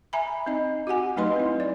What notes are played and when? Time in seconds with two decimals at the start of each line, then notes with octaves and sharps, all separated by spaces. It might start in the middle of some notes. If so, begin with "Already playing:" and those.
0.13 E5 G#5 A#5 B5
0.46 C4 D#4 D#5
0.87 F#4 G4 F#5 G#5
1.16 F#3 A3 D#4 B4 D#5 C6
1.36 C4 E4
1.60 D5